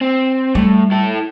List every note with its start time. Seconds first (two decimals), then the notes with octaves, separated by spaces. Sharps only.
0.01 C4
0.55 A2 G3
0.92 E4 A4